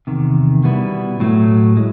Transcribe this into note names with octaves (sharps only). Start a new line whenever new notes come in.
E2 C3 D#3
B2 G3 B3 E4
A2 F#3 A3
G#3